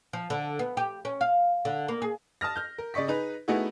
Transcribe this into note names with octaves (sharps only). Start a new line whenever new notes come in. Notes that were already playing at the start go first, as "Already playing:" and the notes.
F3
D3
B3
G4
C#4
F5
D3
A#3
G#4
A5 D#6 F6 A#6
F6 G6
A#4
C#3 D5 D#5 C#6 B6
D#4 G#4 B4
A3 B3 D#4 E4 F#4 G#4